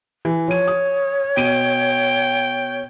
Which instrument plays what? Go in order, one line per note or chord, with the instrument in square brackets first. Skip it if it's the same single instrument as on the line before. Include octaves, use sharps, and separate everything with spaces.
[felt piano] E3
[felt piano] F3 D#7 [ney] C#5
[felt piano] D#6
[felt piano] B2 D7 D#7 [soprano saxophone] G5